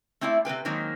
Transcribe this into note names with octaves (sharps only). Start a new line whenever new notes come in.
A3 C4 E4 D5 E5
C3 C4 B4 G5
D#3 F#3 G#3 A#3 C4 D#4